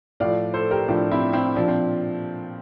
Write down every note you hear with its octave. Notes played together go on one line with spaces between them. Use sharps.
A2 F3 D5 F5
A4 C5
G4 A#4
A2 F3 D4
C4 E4
C4 E4
A#2 F3 D4
C4